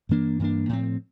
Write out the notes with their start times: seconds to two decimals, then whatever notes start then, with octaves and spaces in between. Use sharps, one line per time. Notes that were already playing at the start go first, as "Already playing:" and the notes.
0.09 G2 E3 A#3 D4
0.39 G2 E3 A#3 D4
0.69 A2 F3 C4